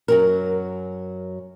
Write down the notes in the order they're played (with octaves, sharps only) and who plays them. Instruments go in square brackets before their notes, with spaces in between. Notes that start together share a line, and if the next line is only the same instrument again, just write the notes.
[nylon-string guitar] F#2 F#3 A#4